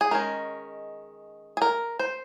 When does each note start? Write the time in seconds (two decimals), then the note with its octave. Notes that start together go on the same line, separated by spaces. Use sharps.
0.01 G#4
0.11 D#3 G#3 C#4 A#4
1.57 G#4
1.62 A#4
1.99 C5